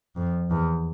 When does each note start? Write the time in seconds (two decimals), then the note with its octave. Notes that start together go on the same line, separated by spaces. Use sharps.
0.16 F2
0.51 E2